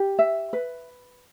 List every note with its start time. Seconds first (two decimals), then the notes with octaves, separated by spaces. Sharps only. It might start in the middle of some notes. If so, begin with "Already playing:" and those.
Already playing: G4
0.19 E5
0.53 B4